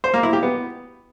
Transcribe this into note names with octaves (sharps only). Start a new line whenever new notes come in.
C5
A#3
E4
G4
B3